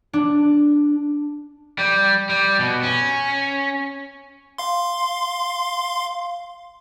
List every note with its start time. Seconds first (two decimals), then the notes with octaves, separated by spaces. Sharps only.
0.13 D4
1.79 G3
2.29 G3
2.59 B2
2.83 C#4
4.58 F5 C6